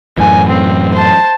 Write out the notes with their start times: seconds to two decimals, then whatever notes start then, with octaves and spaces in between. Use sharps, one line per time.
0.18 F#2 A2 E3 G#5
0.48 C4
0.94 C5 A5